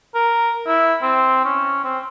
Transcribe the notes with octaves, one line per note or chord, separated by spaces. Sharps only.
A#4
E4
C4
C#4
C4